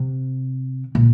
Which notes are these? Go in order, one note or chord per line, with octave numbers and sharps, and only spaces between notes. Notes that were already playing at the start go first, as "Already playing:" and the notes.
Already playing: C3
A#2